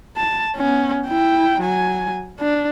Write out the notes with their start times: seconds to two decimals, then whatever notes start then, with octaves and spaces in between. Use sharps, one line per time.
0.17 A5
0.56 B3 C#4
1.07 E4 G5
1.61 F#3 G#5
2.39 D4